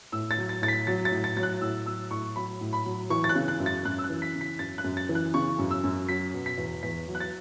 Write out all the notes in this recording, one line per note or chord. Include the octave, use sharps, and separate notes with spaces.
A2 E6
A6
F#3
A6
A2 A6
B6
F#3 A6
A6
A2
A6
F#3 A6
F#6
A2 E6
F#3 E6
A2 C#6
F#3 B5
A2
B5
F#3
E3 C#6
A6
F#6
C#3
F#6
F#2
A6
F#2 F#6
E6
F#6
E3
B6
C#3
B6
F#2 A6
F#6
F#2
A6
E3
F#6
C#3 C#6
F#2
E6
F#2
F#3 B6
B2
B6
E2
E2 B6
F#3
F#6
A6